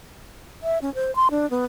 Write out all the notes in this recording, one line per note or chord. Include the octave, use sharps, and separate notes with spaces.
E5
C#4
C5
C6
D4
B3